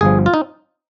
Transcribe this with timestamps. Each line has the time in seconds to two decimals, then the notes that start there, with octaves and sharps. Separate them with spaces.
0.01 G1 G2 F3 G#4
0.26 F4
0.34 D#4